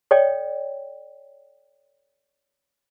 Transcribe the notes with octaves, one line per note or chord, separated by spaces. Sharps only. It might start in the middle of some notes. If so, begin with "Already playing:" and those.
A4 C#5 D5 G5